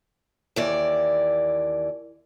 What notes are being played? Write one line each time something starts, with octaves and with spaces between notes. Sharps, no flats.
D#2 E3 D5